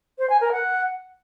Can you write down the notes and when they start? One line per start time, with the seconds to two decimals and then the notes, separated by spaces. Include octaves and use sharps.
0.19 C5
0.30 G#5
0.41 A#4
0.52 F#5